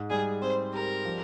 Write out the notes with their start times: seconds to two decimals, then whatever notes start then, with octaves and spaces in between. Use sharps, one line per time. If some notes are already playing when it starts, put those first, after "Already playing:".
Already playing: G#2
0.10 G3 G#4
0.42 C4 C5
0.73 G4 A#4
1.05 F3